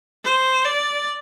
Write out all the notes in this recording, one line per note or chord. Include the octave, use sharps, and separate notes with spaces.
C5
D5